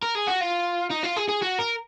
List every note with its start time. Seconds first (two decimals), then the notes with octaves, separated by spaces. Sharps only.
0.03 A#4
0.15 G#4
0.27 F#4
0.41 F4
0.91 D#4
1.04 F4
1.17 G#4
1.29 G#4
1.42 F#4
1.59 A#4